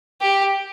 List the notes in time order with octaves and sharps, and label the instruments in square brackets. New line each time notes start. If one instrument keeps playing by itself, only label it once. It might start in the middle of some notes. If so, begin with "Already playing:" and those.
[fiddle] G4